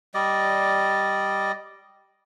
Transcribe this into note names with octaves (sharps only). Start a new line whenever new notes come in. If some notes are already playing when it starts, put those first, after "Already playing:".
G3 D5 D#5